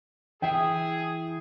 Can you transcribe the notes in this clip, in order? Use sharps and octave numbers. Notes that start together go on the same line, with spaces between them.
E3 E4 G#4 E5 G5